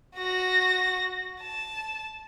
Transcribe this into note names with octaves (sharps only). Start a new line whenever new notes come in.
F#4 A#6
A5